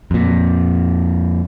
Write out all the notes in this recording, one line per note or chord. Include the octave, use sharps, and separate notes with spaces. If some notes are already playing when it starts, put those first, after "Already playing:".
F2 A#2